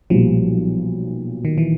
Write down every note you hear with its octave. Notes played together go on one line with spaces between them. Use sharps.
B1 A#2 F3 G3
D#3
E3